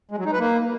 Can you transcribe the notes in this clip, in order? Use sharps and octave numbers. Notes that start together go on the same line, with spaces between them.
G#3
F#3
D#4
B4
A#3